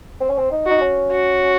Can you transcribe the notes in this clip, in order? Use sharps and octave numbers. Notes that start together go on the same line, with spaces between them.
C4
C#4
C4
D#4
D#4 F#4
C#4
F#4